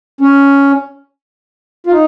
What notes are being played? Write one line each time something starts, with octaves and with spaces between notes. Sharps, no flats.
C#4
F4
D#4